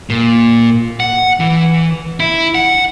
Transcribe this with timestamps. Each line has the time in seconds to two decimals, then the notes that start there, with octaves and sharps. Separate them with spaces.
0.10 A#2
1.00 F#5
1.40 E3
2.20 E4
2.55 F#5